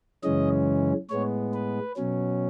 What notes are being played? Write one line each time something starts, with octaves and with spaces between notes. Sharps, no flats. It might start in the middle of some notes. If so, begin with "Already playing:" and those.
F#2 C#3 E3 G#3 C#4 D#5
A2 G#3 B3 C#5
B4
B2 F#3 C#4